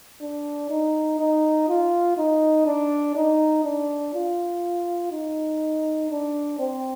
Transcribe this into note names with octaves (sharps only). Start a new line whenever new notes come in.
D4
D#4
D#4
F4
D#4
D4
D#4
D4
F4
D#4
D4
C4